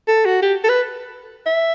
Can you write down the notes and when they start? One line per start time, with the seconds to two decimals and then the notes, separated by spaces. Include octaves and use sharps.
0.08 A4
0.25 F#4
0.42 G4
0.64 A4
0.69 B4
1.46 E5